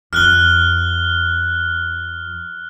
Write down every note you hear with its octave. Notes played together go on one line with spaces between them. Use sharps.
F2 F6 F#6 G7